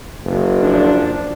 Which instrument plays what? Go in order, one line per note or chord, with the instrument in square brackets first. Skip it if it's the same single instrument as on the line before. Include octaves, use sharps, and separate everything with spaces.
[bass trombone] F#1
[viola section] F3 D4